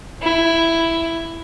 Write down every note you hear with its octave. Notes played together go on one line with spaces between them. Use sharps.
E4